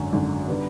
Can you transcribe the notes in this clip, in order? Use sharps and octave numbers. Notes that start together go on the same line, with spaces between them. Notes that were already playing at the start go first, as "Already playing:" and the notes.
Already playing: G#1 F#2 D3
G#1 F#2 D3
D3 G3 B3